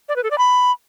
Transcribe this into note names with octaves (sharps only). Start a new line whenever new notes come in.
D5
B4
A4
D5
B5